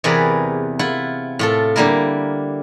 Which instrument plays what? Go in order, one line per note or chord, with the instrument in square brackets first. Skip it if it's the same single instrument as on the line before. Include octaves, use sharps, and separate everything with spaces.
[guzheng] E2 C3 G#4 A#4 B4 D5
E4 F4 F#5
A2 F4 A4
D3 G3 A#3 E4 A#4